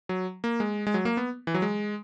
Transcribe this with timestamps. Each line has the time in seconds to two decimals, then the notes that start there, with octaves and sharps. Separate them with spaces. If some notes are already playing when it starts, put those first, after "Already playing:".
0.09 F#3
0.44 A#3
0.60 G#3
0.87 G#3
0.94 F#3
1.05 A#3
1.17 B3
1.47 E3
1.54 F#3
1.62 G#3